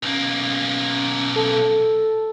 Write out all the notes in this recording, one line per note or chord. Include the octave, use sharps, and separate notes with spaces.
B1 A#3 C#4
A4